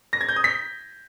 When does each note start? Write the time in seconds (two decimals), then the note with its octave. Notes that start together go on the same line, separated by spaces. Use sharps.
0.13 A#6
0.21 G#6
0.29 G6
0.36 D#6
0.44 B6